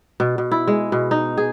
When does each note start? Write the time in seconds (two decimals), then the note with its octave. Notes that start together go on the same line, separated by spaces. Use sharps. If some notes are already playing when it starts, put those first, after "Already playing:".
0.20 B2
0.38 B2
0.51 E4
0.68 G#3
0.92 B2
1.11 D#4
1.37 G#4